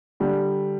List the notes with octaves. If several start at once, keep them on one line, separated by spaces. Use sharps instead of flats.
D3 G3 D4